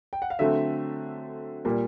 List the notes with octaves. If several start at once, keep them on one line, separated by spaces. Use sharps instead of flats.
G5
F#5
F5
D3 F#3 A3 C4 E5
A#2 G3 A#3